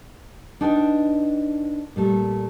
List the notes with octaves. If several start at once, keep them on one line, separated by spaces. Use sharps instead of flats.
D4 D#4 B4 G5
A#2 G3 A3